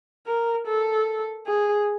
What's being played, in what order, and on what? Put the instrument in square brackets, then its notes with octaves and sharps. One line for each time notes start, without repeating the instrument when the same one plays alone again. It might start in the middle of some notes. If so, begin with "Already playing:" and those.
[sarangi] A#4
A4
G#4